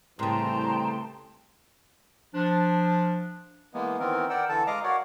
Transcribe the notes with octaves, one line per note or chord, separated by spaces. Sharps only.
C2 A2 C#3 E3 G5 A5 A#5 C6
F3 D4
E3 G#3 A#3 B3
D#3 E3 B3 C4 A#4
A#4 D5 F#5 G5 E6
D3 E3 A4 A5
G#3 D#5 F5 A#5 D6
F#4 A#4 C#5 D5 F5 F#5